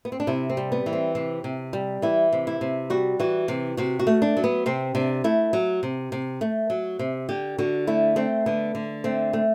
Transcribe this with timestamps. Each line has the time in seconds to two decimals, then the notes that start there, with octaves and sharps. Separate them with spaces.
0.05 B3
0.12 C4
0.20 D4
0.27 C3 E4
0.50 C4
0.57 G3
0.72 B3
0.86 E3
0.93 C4
1.15 C3 C4
1.44 C3
1.73 G3
2.02 E3 E4
2.32 C3
2.47 E4
2.61 C3
2.90 G3 F#4
3.20 E3 F#4
3.48 C3
3.77 C3 F#4
3.99 F#4
4.07 A3
4.22 D4
4.37 F#3
4.44 B3
4.66 C3 C4
4.95 C3 D4
5.24 A3 E4
5.53 F#3
5.83 C3
6.12 C3
6.41 A3
6.70 F#3
6.99 C3
7.29 D3 G4
7.58 D3 F#4
7.87 A3 E4
8.16 A3 C4
8.46 D3 B3
8.75 D3
9.04 A3 C4
9.33 A3